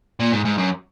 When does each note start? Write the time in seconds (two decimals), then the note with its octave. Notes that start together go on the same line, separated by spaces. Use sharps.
0.20 A#2
0.32 G#2
0.45 G#2
0.58 F#2